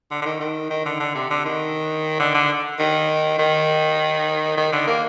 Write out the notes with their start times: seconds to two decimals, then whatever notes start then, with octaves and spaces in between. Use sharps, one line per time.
0.11 D3
0.21 D3
0.25 D#3
0.40 D#3
0.70 D#3
0.85 D3
1.00 D3
1.15 C3
1.30 D3
1.45 D#3
2.20 D3
2.35 D3
2.79 D#3
3.39 D#3
4.57 D#3
4.72 D3
4.87 A#3